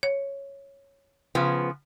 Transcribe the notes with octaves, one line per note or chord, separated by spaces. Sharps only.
C#5
C#3 F3 B3